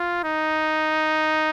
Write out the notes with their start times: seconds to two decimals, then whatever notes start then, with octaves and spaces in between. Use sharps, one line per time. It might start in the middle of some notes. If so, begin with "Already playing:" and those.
Already playing: F4
0.24 D#4